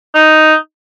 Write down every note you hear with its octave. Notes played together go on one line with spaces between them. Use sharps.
D#4